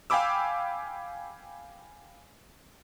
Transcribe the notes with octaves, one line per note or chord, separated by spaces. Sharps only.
F5 G5 G#5 B5 D6 E6